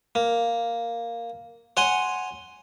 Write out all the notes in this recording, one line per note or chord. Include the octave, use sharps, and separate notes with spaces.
A#3
C#5 F#5 G#5 C6